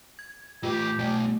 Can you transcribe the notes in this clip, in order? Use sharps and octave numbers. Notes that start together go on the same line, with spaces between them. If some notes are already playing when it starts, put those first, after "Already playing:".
G#6
A2 F4 G4 B4
B2 F#3 A3